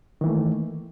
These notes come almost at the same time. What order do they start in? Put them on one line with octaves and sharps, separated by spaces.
D#3 E3 A#3 A3